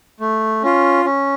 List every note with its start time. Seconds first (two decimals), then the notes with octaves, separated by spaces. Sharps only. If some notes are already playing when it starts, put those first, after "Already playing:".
0.20 A3
0.63 C#4 F4
1.05 C#4